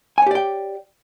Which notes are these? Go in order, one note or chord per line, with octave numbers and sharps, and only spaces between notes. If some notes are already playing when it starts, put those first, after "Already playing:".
G4 C#5 D5 G5 G#5